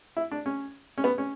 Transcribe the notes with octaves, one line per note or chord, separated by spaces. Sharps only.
E4
D4
C#4
C#4
B3
C#4